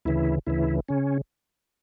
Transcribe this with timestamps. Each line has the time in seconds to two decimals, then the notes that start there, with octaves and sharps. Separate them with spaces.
0.05 D2 C#3 E3 E4
0.47 D2 C#3 E3 E4
0.88 C#3 C#4